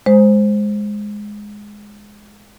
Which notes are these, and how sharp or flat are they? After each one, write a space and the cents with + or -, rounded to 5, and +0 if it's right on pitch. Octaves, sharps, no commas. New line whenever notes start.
G#3 +0 C5 +0